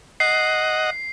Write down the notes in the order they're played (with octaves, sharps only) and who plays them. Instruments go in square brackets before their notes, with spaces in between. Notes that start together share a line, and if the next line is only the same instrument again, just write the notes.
[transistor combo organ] D#5 F#5 [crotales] C7